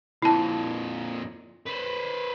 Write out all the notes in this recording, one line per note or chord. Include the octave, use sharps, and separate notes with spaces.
F2 A#2 E4 A5
B4 C5